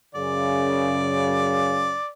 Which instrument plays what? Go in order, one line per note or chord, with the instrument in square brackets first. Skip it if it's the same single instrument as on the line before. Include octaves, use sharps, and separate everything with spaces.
[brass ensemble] F#2 C#3 [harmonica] D5